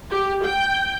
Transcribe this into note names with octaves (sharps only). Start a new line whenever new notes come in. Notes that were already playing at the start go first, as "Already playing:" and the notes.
G4
G5